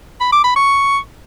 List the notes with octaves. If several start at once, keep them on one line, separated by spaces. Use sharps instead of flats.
B5
D6
B5
C#6